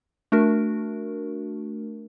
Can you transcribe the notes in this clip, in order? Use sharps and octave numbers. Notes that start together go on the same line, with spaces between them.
A3 D4 F#4 A#4